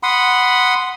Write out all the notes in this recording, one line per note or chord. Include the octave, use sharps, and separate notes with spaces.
F#5 B5 C6 D#6